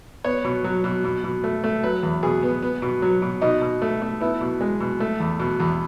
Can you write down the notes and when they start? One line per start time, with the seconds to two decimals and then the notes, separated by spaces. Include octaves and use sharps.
0.24 B3 C#5
0.44 B2
0.64 F#3
0.84 B2
1.04 B2
1.24 B2
1.44 A3
1.64 A3
1.83 F#3 B4
2.03 E2
2.23 B2 G#4
2.43 B3
2.62 B3
2.82 B2
3.02 F#3
3.22 B2
3.41 B2 D#4
3.62 B2
3.82 A3
4.02 A3
4.21 B3 E4
4.41 B2
4.61 G#3
4.80 B2
5.00 A3
5.20 E2
5.40 B2
5.60 E2